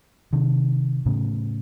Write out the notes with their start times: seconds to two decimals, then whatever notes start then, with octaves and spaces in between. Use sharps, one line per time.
0.33 C3 D#3
1.06 A2 C#3